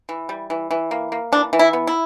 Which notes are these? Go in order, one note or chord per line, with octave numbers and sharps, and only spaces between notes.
E3
G3
E3
E3
A#3
A#3
E3 D4
E3
E4
B3
E4